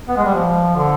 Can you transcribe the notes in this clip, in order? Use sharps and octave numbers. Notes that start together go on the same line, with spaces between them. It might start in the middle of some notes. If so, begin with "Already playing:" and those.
B3
G#3
G3
F3
D3